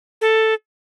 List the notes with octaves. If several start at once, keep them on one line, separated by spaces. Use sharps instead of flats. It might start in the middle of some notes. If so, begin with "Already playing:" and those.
A4